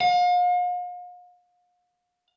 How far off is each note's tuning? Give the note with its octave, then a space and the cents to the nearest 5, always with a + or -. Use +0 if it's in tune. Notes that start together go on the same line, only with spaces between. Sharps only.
F5 +40